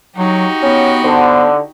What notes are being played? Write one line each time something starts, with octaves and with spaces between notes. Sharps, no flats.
F#3 D#4 F#4 G4
B3 C#4
D3 B3 C5